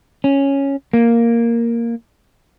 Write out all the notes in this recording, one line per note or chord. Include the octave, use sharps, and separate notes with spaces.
C#4
A#3